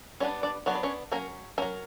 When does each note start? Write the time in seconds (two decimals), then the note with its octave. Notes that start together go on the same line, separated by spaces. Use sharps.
0.20 G3 B3 C#4 D4 C#5
0.43 D4 D5
0.66 F#3 B3 D4 C#5
0.75 B4
0.83 C#4 C#5
1.12 F#3 A#3 C#4 A#4
1.58 F#3 A#3 C#4 A#4